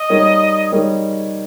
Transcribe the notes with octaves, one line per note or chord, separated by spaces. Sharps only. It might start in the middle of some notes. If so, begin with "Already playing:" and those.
Already playing: D#5
G3 A#3 D#4 A#4 C#5
G3 A#3 D#4 A#4 C#5